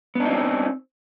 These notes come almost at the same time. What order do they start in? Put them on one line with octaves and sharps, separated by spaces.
B3 D4 D#4 C4